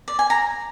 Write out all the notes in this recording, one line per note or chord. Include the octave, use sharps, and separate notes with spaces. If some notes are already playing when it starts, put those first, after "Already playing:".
D5
G#5
A#5